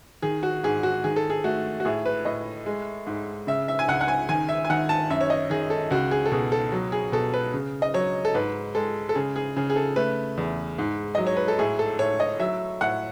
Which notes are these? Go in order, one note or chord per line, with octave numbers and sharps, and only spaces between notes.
D#3 G#4
F#4
G#2 G#4
F#4
D#3 G#4
A4
G#4
A3 F#4
F#4
A2 G#4
B4
A2 D#5
G#3
G#2
C#3 E5
E5
G#5
C#2 F#5
F#5
G#5
D#3 G#5
E5
G#5
D#3 F#5
A5
F#2 E5
C#5
D#5
D#3 G#4
A4
C#2 F#4
G#4
A4
B2 G#4
A4
F#3
G#4
B2 A4
B4
C#3
D#5
F#3 C#5
A4
G#2 B4
G#3 A4
A4
C#3 G#4
G#4
C#3 G#4
G#4
A4
A3 B4
E2
G#2
F#3 D#5
C#5
B4
A4
A2 G#4
A4
A2 C#5
D#5
F#3 E5
A2 F#5